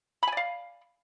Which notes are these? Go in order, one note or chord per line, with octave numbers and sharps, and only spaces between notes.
D5 F5 G#5 B5